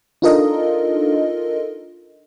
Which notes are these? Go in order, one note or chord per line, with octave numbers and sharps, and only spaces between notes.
D4 D#4 F4 A4 A#4 D#5